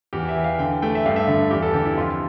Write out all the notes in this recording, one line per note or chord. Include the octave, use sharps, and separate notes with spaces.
E2 G4
E5
E3
F5
D3 G5
A3 G5
E5
G2 F5
E5
D3
E2 G4
A4
D3 G4
E4
F2 F4